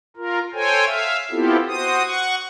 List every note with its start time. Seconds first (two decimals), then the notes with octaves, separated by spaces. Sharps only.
0.17 F4 A#4
0.53 A4 C5 C#5 G5 G#5
0.85 E5 F5
1.31 B3 C4 E4 F4 G4 A4
1.68 F#4 C5 D#6
2.06 F#5 C#6